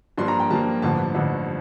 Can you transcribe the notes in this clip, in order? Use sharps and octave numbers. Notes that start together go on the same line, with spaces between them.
G2 F3 A#3 D4 C6
A#5
G5
G2 F3 A#3 D4 A5
A1 G2 D3 F3 A5
A1 G2 D3 F3